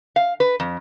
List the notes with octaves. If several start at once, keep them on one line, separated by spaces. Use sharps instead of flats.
F5
B4
F2